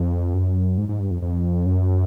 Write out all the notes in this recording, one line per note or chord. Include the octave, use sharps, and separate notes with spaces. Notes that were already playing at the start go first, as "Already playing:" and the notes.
Already playing: F2
F#2
G#2
G#2
G2
F2
F2
F#2